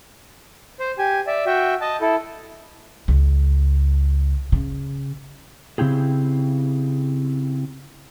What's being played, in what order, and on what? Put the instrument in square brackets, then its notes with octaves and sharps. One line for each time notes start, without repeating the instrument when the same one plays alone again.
[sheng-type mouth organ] C5
G4 G#5
D5 E5
F#4 E5 G5
D#5 A5
E4 A4
[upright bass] C#2
C#3
[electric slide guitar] C#3 C4 E4 G4 G#4